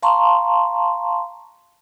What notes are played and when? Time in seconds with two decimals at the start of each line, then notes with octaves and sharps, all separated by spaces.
0.03 F5 A5 A#5 C6 C#6